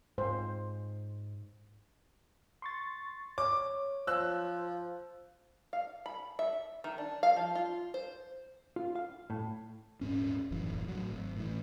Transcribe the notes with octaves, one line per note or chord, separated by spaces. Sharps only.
G#2 C5
C6 C#6 A6
C#5 D6
F3 E6 F#6
F5
B5
E5
D#3
D4
F5
F3
F4
C5
F4
F5
A2
D#1 A#1 G#2 C#4
E1 A1 F#2 E3
A2 F#3
G#1
A2 E3